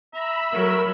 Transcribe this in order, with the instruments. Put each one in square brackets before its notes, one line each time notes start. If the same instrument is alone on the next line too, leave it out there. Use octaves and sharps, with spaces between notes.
[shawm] E5 [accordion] A#5 [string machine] B5 E6
[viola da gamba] F#3 [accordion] A3 A#4